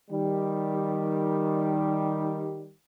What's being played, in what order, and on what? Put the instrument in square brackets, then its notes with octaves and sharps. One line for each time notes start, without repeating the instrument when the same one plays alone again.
[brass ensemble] D#3 G3